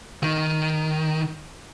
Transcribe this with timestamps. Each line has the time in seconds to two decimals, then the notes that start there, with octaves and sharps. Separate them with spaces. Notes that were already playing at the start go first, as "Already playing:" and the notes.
0.23 D#3